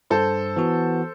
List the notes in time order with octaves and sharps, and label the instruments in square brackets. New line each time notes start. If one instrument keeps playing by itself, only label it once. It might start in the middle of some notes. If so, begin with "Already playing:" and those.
[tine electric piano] G2 [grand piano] A4 C5
[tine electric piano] E3 B3 F#4